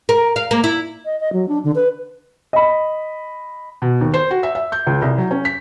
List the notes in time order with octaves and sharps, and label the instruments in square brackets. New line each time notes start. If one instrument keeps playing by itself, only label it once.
[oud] A#4
F5
A#3
E4
[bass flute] D#5
D#5
F#3
D4
D3
B4
[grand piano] D#5 B5
[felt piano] B2
D#2
C5
F#4
E5
E5
G6
C#2
C2
F#3
C#4
B6